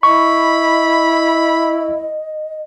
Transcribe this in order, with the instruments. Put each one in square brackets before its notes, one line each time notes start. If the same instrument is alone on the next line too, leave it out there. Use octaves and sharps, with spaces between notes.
[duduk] E4 [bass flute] D#5 [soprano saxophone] B5 [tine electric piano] C#6